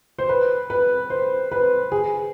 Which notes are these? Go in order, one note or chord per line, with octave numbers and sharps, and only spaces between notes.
C5
B4
B4
C5
B4
G#4